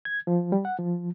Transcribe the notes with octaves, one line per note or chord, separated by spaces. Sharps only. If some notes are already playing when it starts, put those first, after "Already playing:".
G#6
F3
G3
F#5
F3